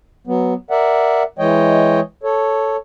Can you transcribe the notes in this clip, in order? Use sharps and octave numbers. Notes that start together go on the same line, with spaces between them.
F#3 B3
A#4 D5 E5 F#5
E3 G#3 C#5 D#5 G5
A4 C#5